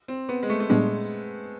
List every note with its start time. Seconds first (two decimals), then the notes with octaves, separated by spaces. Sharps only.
0.08 C4
0.29 B3
0.43 G#3
0.49 A3
0.60 A3
0.70 A#2 G3 G#3 B3 D4